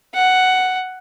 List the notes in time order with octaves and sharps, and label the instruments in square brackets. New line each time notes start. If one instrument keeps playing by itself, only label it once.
[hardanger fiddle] F#5